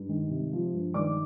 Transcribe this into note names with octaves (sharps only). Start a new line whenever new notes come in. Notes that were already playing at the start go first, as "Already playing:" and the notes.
Already playing: G2
D#3
C3
F3
G2
D#3 D5 D6